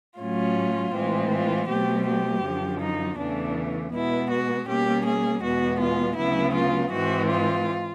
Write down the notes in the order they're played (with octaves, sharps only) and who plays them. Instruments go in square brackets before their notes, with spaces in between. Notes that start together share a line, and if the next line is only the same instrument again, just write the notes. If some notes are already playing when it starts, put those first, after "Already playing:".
[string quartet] A2 F#3 A3 C#4 F4
A2 E3 G#3 C4
F4
B2 F#3 A3 C4 G4
G4
F#2 D3 F3
D#4
E2 C#3 E3 A3 D4
B2 G#3 B3 E4
F#4
B2 G3 A#3 C#4 G4
G#4
E2 B2 G#3 B3 F#4
F4
D2 C#3 F#3 B3 E4
F4
G#2 E3 G#3 C4 F#4
F4